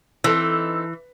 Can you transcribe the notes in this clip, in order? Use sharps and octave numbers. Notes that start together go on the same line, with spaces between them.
E3 C4 D#4 A4